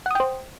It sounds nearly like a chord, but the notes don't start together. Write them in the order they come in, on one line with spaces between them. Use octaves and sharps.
F#5 D#6 G5 C5